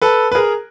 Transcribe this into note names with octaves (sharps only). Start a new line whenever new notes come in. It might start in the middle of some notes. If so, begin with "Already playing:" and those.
A4 B4
B4
G#4 A#4